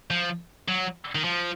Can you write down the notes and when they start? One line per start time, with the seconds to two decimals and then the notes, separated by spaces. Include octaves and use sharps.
0.10 F3
0.68 F#3
1.15 D#3
1.24 F3